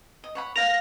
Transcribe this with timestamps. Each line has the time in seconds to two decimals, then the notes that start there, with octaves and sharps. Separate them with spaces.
0.24 D#5
0.35 C#5 F#5 B5
0.56 A#4 F5 F#5 A#6 F7